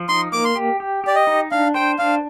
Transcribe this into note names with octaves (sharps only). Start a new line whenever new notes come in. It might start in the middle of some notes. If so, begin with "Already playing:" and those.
Already playing: F3
D#4 C6
A#3 D6
C6
G4
G4
G4 D5
D#5
D#4
D4 F5
C5 G5
D4 F5